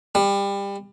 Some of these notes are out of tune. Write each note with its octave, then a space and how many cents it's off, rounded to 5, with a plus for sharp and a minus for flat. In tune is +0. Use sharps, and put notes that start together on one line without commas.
G3 +25